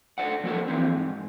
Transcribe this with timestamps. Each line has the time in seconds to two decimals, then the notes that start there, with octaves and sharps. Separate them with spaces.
0.18 A4 C5 D5 F#5
0.44 F3 A#3 F#4 A4 A#4
0.68 E3 F3 C4
0.96 G#2